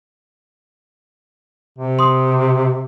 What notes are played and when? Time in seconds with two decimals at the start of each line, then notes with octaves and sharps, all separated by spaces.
1.78 C3
1.99 C6 D#6